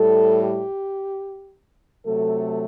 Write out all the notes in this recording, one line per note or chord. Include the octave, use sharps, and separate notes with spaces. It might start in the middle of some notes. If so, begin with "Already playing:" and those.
Already playing: A2 G3 A4
G4
C3 F#3 A3 A4